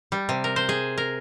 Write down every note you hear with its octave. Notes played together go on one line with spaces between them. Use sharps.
G3
C3
A#4
C5
G#4
A#4